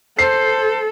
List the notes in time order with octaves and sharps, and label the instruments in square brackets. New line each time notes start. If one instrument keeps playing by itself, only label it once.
[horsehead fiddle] A4 [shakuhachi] C5 [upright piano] C7